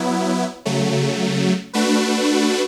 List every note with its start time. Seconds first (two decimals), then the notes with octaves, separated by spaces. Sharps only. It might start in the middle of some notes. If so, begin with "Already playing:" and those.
Already playing: F#3 B3 E4
0.65 C#3 F#3 A3
1.73 A3 D4 F#4 B4